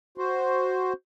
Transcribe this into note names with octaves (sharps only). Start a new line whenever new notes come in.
F#4 C5